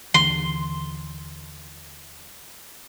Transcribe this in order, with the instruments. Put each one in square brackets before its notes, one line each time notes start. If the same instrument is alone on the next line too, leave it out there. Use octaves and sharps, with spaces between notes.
[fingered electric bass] D#2 D3 E3 [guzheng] C6